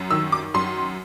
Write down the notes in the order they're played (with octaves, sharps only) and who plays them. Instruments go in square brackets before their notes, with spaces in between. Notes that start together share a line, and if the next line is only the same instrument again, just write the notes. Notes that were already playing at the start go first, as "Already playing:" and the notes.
Already playing: [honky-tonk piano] F#2
D#3 E6
D6
F#2 C6